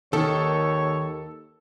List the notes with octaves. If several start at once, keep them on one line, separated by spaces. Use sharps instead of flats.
D#2 D#3 A4 C#5